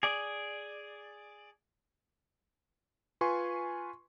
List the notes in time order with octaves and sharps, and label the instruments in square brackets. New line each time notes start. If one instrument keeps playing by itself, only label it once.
[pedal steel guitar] G#4 D5
[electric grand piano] F4 B4 G#5 C6 C#6